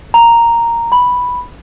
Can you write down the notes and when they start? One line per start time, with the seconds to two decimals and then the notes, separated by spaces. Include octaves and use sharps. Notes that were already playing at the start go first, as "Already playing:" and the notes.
0.14 A#5
0.92 B5